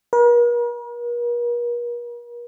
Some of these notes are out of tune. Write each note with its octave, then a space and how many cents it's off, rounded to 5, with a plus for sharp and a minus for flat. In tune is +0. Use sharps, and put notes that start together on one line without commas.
A#4 +45